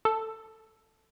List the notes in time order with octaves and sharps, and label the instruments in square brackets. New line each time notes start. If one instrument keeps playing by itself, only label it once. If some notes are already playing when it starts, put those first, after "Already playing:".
[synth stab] A4